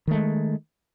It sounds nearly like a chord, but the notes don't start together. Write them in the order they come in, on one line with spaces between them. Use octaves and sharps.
D#3 A3 G#3